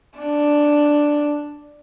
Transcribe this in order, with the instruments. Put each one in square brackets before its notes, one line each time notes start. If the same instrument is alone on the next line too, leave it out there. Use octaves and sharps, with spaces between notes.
[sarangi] D4